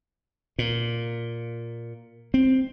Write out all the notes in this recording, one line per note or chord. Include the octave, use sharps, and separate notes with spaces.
A#2
C4